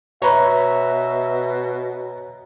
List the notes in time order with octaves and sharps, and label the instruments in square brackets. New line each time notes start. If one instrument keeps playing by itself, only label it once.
[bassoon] B2 [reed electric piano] B4 C#5 [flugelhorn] E5 [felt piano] A#5